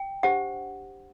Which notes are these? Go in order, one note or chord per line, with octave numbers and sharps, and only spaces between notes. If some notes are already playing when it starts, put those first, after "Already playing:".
Already playing: G5
D4 G4 C5 F#5